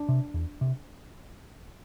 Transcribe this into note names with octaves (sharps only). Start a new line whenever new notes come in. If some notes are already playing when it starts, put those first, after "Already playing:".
Already playing: D4
C3
E2
C3